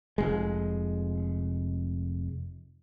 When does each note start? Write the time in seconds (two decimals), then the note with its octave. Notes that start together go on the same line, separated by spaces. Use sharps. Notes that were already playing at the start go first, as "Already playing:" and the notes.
0.18 F1 G#3